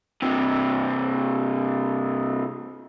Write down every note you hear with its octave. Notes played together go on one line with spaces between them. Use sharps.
G2 C3